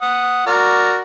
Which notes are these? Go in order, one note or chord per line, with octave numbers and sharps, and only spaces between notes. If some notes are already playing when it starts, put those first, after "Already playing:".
F#5 D#6
F#4 A#4 D5